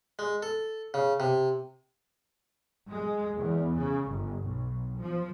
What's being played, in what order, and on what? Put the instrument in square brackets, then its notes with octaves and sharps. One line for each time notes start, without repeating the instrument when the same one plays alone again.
[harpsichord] G#3
A4
C#3
C3
[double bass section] G#3
E2
C#3
G1
B1
F3